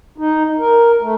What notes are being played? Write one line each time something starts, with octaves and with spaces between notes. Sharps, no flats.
D#4
A#4
A3